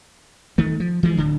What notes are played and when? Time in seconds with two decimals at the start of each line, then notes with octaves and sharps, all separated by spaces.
0.58 D#3 A3
0.80 F3
1.03 E3 F3 G#3
1.17 D1 D3